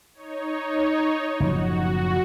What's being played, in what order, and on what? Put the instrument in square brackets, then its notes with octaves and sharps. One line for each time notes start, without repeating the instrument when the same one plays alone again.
[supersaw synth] D#4 C#5
[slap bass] F#1 A2 F3 [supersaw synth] F#4